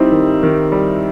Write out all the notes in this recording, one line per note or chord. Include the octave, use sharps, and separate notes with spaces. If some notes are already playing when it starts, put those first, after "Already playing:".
Already playing: G3 C4 D#4 E4
D#3
D#3
G3